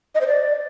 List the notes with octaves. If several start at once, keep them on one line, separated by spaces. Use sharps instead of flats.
D#5
C5
D5